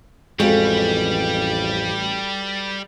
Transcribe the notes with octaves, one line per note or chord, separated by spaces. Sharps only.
A1 F2 G3 G#3 F#4 A4 B4